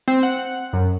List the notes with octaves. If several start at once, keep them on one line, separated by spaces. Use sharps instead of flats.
C4
F#5
F#2